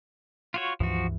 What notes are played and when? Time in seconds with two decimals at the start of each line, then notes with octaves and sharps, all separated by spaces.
0.54 F4 F#4 C#5
0.80 C#2 G2 E3 F3 F#4